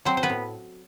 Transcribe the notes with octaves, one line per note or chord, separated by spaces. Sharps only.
F#3 C4 C5
C5
B3 B4
A2